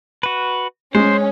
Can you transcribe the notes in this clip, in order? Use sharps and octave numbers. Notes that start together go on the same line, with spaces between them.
F#4 B4
G#3 C#4 C5